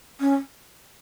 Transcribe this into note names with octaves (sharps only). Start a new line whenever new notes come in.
C#4